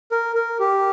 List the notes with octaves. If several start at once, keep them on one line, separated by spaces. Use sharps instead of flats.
A#4
A#4
G4